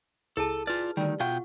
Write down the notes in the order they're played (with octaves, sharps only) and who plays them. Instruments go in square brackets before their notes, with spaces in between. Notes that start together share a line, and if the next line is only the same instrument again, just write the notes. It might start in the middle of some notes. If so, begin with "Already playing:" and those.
[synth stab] C#2 [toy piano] E4 G#4 A5 [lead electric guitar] A4
[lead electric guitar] F4 D5 [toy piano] B4
[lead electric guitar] D2 D#3 [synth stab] G3
[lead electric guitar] B2 G5 [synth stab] F4 [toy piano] F#5 C#6